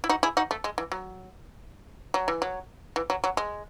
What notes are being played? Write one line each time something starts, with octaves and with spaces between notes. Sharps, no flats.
E4
D#4 F#4
E4 G#4
D#4 F#4
A3
G#3
E3
F#3
F#3
E3
F#3
E3
F#3
F#3
G#3